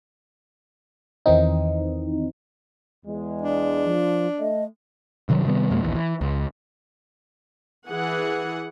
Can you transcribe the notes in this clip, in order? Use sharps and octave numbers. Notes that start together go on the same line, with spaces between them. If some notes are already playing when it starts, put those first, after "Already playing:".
E2 D#3 E3 C4 D#4
E2 G#3
D4
F3
A3 D#5
G2 C3 D#3 F#3
C3 D#3 G3 B3
F2 B2 G#3 A#3
A#1 D#2 E3
E3
C#2
E3 G#4 F#5